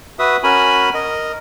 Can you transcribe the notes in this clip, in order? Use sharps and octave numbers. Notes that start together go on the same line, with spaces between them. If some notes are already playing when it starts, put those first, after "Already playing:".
F#4 B4 E5 D#6
C#4 F#4 A#4 G#5 B5
A#4 D#5